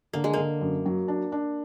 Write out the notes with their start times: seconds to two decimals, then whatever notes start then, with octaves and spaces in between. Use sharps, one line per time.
0.13 D3 A#3
0.24 G#3
0.33 D3 A#3
0.61 F#2
0.85 F#3
1.08 D4
1.32 D4